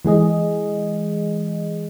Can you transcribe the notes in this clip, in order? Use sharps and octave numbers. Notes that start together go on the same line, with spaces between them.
E3 G#3 G#4 D#5